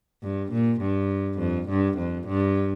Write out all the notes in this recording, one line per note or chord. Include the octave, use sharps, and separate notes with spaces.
G2
A#2
G2
F2
G2
F2
G2